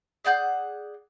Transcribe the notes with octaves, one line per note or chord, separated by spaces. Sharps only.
G#4 D5 F#5 G6